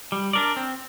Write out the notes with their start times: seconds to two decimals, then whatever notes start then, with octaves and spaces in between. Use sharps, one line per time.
0.12 G3
0.33 D4 A#4 D5
0.56 C4